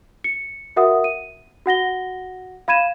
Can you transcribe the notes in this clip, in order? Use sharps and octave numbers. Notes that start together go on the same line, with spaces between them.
C#7
F#4 A#4 E5 F#5 D#6
D#7
F#4 F#5 A#6 G7
F5 B5 G#6 D#7 E7